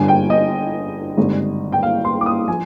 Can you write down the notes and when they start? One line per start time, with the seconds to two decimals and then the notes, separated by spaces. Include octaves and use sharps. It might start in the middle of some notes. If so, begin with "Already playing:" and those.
Already playing: G1 G2 D3 G#5
0.08 G5
0.30 D#5
1.17 G#1 G2 D3 G3
1.72 G5
1.83 F5
2.05 C6
2.21 D6
2.26 D#6
2.48 F3 G#5